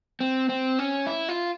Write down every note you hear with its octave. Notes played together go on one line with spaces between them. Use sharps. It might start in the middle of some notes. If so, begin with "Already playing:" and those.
C4
C4
C#4
E4
F4